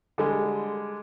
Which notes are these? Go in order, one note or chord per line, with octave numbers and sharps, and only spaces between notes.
D3 G3 G#3